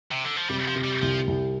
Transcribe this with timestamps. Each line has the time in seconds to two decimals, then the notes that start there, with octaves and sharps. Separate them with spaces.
0.11 C3
0.24 D3
0.36 F3
0.49 C3 G3
0.68 F3
0.76 C3
0.84 G3
1.02 C2 F3
1.27 C2